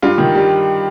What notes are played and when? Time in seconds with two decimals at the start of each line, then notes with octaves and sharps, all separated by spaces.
0.02 G2 F4
0.18 D#3
0.35 G3